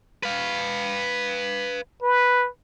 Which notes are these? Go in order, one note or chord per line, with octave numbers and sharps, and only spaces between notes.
B4 F5
B4